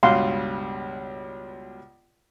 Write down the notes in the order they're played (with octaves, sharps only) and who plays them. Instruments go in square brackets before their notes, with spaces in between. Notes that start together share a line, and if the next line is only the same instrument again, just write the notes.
[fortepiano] C#2 G2 B2 [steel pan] F5 F#5 C6